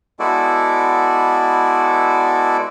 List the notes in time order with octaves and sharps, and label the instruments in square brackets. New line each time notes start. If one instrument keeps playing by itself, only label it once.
[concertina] G#3 B3 E4 F#4 A4 D5